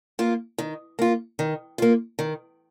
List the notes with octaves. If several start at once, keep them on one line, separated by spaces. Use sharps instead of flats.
A#3 F4
D#3
A#3 F4
D#3
A#3 F4
D#3